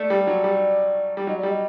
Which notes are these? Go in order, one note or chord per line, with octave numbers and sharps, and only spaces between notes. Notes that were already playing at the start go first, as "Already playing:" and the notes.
Already playing: A3 D5
G3
F#3
G3
G3
F#3 D#5
D5
G3
D#5